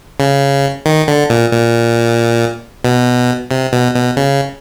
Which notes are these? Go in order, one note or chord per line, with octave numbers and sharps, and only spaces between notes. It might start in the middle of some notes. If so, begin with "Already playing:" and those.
C#3
D#3
D3
A#2
A#2
B2
C3
B2
B2
C#3